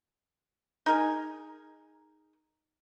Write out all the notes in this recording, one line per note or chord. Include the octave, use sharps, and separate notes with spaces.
D#4 G#4 A#4 G#5